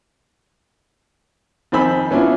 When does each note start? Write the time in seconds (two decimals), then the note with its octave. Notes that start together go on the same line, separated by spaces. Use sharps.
1.72 F2 D#3 C5 G#5 B5 E6
2.11 B3 C#4 D4 E4 F4